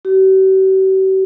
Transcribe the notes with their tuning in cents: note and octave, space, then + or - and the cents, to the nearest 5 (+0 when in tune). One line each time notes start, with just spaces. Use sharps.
G4 -45